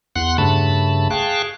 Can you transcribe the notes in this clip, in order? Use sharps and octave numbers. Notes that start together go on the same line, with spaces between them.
E2 F#5 C6 F#6
G2 C#3 A3 A5 B5
G#4 F5 G5 A5 C#6 F#6